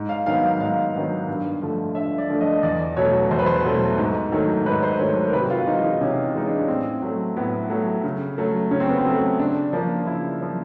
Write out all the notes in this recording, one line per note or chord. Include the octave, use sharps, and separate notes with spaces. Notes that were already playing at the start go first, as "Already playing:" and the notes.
Already playing: G#2
F5
D#3 F#3 B3 F5
F5
G#2 F5
D#3 F#3 B3
G2
D3 F3 A3
G2 E5
D5
D3 F3 A3
D#5
E2 D5
B2 F#3 A3 C#5
E2 C5
B4
C5
B2 F#3 A3
G#2
D#3 F#3 A3
G#2 B4
C5
D#3 F#3 A3 C#5
C5
A#4
C3 B4
F#4
F4
E3 G#3 D#4
D#4
C3 C#4
E3 G#3 D#4
D4
C#4
A2 C4
F#3 A3
A2 B3
F#3 A3
C#3
F#3 A3
C#3 C#4
C4
B3
C4
F#3 A3
C#3 D4
F3 A#3 D4
C#3 E4
F3 A#3